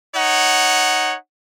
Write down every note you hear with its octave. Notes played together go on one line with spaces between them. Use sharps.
D#4 C#5 F#5